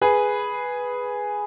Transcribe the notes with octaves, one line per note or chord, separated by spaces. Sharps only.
G#4 B4